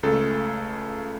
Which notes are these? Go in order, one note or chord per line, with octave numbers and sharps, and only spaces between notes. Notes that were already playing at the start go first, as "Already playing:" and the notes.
C#2 C#3 A3 A4